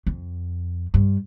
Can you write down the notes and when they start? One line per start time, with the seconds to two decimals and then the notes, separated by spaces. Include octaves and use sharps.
0.07 F2
0.94 G2